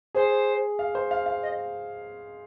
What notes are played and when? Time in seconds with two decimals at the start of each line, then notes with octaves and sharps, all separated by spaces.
0.15 G#4 C5
0.79 F5
0.95 C5
1.11 F5
1.26 F5
1.42 D#5